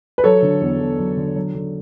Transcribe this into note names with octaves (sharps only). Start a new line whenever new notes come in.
B4
F#3 A4 C#5
D3
E2
E2
F#3
D3
F#3
D3